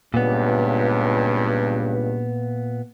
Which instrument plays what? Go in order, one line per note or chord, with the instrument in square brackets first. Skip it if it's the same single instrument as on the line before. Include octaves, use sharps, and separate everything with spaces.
[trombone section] C#2 G2 [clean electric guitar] A#2 B3